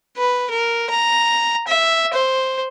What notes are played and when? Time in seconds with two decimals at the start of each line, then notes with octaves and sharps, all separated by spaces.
0.17 B4
0.51 A#4
0.90 A#5
1.68 E5
2.13 C5